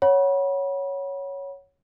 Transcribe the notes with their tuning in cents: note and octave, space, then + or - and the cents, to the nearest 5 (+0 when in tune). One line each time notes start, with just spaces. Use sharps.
C#5 +0 F#5 +0 B5 -30